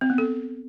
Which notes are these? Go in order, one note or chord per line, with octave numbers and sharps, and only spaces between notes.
C4
B3
A4